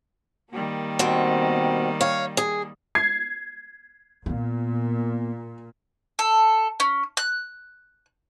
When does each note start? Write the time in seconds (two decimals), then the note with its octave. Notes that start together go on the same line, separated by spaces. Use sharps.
0.51 D#3 G3 A#3
0.99 B2 C4
2.01 C#5 F5
2.37 G#4
2.95 G#6 C7
4.26 A#2 A#3 B3
6.19 A4
6.80 C#4
7.17 F#6